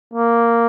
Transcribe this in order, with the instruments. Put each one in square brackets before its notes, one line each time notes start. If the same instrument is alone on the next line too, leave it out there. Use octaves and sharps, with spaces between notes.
[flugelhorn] A#3